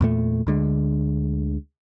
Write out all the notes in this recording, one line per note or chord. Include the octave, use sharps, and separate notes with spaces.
E2 A#2 A3
D2 D3 G#3